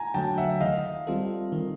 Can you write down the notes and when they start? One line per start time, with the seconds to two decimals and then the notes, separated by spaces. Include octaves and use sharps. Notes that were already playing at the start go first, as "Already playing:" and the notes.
Already playing: G#5 A#5
0.14 D3 F#3 A3 G5 A5
0.37 E5 F#5
0.60 D#3 D#5 F5
1.07 G3 C4 F4 A4
1.52 D#3